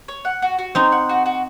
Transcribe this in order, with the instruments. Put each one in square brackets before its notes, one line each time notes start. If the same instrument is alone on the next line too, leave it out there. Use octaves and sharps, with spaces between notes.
[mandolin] C#5
F#5
F#4
F#4
[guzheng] C4 D#4 [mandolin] C#5
[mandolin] F#5
F#4
F#4